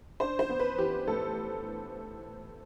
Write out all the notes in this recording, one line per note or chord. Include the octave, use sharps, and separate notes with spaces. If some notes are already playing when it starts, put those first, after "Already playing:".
D4 C5
C5
B3
B4
E3 G4
A2 A4